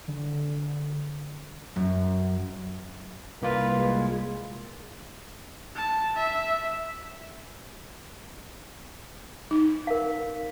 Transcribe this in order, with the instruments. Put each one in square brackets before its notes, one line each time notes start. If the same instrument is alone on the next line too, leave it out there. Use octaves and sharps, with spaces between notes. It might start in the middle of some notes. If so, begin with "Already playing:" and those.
[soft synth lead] D3
[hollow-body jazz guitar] F#2
[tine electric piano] C2 A#3 F4 [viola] B4
[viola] G#3
[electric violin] A5
E5
[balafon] D#4
[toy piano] A#4 F5